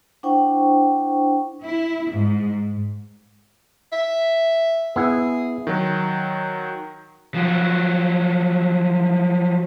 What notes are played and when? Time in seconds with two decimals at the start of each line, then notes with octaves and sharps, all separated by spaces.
0.23 D4 E4 C5 F#5 G5 C#6
1.62 E4
2.11 G#2
3.92 E5
4.96 B3 E4 G#4
5.67 D#3 F#3
7.35 F3 F#3